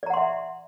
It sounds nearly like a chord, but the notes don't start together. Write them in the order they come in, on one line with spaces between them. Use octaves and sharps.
D5 A#5 F#5 C6 E5